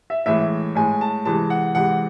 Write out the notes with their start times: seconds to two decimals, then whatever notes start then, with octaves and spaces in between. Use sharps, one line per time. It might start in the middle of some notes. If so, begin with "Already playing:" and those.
0.10 E5
0.26 A2 E3 G#3 E5
0.75 A2 G#3 G#5
1.01 A5
1.25 C3 E3 G#3 A5
1.50 F#5
1.75 C3 E3 G#3 F#5